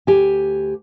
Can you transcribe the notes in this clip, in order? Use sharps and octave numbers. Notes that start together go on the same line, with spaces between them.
D2 G4 G#5